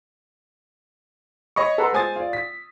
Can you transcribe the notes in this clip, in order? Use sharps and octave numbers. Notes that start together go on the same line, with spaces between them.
C#5 D#5 B5 C#6
A4 B4 F#5 A#5 C6
G#3 C5 G#5 D#6 A6
F4 D5
B6